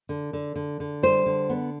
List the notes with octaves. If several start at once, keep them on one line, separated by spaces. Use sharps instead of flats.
D3
D3
D3
D3
G3 C5
D3
B3